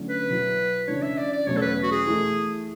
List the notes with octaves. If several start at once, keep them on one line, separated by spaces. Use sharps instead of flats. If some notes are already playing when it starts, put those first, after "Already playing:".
Already playing: D3 F#3 A3 C#4 E4
B4
B2 F#3 B3 E4
C#3 E3 G#3 D4 C#5
E5
D5
D5
E2 B2 F#3 A3 C#4 C#5
A4
B4
F#4
G#4
E3 A3 E4 A4